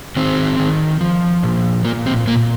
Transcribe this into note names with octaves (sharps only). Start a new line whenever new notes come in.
D#3 C4
D#3
F3
A#2
A#2 A#3
C4
A#2 A#3